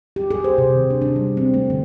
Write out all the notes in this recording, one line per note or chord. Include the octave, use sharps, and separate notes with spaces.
G4
G#4
C5
C3
D#3
D4
D4
G3
C4
A3
D3